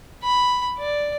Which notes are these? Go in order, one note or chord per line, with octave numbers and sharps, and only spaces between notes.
B5
D5